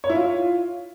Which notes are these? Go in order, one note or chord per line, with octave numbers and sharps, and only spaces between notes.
C#5
E4
F4